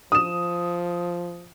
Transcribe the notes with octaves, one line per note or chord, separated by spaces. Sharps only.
F3 D#6 E7